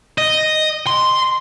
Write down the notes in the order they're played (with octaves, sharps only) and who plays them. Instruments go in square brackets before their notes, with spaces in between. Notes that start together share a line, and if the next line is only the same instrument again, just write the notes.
[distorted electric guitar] D#5
C6